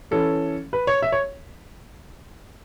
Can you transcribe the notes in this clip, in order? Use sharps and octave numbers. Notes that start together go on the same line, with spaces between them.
E3 C#4 A4
B4
C#5
E5
C#5